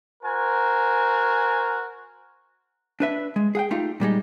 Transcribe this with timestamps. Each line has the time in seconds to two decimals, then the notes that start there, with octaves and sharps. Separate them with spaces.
0.24 F#4 A#4 C5 G#5
3.00 D4 B4 E5
3.36 G#3
3.55 G#4 F#5 G5
3.71 A3 D#4 F4 G4
4.00 A#2 G3 G#3 D#4